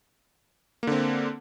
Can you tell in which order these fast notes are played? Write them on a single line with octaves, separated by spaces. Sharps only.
A#3 D3 C4